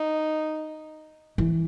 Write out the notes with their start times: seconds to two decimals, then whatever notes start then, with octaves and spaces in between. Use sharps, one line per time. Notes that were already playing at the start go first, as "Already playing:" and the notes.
Already playing: D#4
1.38 E3